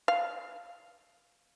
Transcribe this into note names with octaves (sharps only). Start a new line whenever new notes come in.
F5